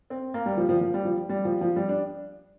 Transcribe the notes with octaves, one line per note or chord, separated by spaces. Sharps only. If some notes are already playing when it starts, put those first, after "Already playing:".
C4
A#3
G3
F3
F3
F3
G3
F3
G3
F3
F3
G3
D4